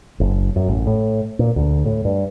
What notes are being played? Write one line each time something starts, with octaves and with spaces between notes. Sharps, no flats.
F#1
F#2
A1
A2
A#2
D2
A2
G2